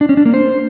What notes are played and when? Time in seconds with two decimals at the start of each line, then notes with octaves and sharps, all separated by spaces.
0.01 D4
0.09 C#4
0.17 D4
0.25 A#3
0.34 C5